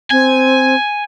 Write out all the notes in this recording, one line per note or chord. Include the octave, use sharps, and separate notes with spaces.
C4 G#5